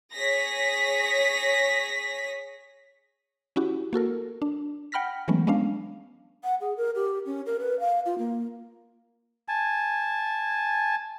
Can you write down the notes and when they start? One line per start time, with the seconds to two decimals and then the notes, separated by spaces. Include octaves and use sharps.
0.13 G#4 C#5 A#6 B6
3.56 C#4 E4 F#4 G4
3.93 A#3 F#4 A4 A#4
4.42 D4
4.92 F#5 G5 B5 F6 A#6 B6
5.28 E3 F#3 G#3 A3 B3 C#4
5.47 G#3 B3 C#4 D4 F5
6.44 F#5
6.61 G#4
6.77 A#4
6.95 G4
7.26 C#4
7.46 A#4
7.60 B4
7.80 F5
8.06 F4
8.19 A#3
9.48 G#5 A5